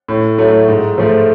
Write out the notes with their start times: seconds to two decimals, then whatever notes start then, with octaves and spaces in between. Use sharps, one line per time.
0.08 A2
0.38 F#3 A3
0.68 G#2
0.98 F3 A3